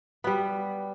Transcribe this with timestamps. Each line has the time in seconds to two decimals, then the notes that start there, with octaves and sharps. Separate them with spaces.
0.24 G3 B3